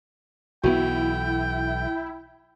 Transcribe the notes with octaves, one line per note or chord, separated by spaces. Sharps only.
B1 E3 B3 E4 F#4 G5